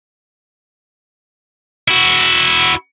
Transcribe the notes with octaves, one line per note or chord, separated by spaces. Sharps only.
E4 F#4